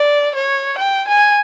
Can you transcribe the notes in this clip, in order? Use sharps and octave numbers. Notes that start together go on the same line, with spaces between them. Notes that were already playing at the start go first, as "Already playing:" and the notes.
Already playing: D5
C#5
G5
G#5